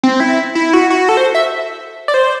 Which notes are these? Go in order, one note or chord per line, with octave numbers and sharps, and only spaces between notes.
C4
E4
E4
F#4
F#4
A4
C5
E5
D5
C5